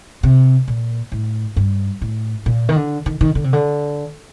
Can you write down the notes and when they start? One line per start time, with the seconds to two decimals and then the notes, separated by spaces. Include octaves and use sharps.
0.23 C3
0.68 A#2
1.12 A2
1.56 G2
2.01 A2
2.46 A#2
2.69 D#3
2.76 D3
3.06 D#3
3.21 D#3
3.35 D3
3.44 C3
3.53 D3